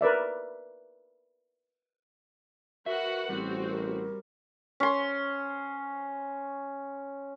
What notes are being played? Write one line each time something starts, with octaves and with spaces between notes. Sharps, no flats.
A#4 B4 D5 E5
F#4 A#4 B4 E5 F#5
A1 G3 C4 F#4
A#4
C#4 C6